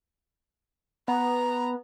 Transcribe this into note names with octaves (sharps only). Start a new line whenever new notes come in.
B3 A#5